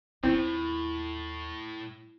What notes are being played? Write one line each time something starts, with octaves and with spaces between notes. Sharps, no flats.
D#2 A2 C4 E4 F4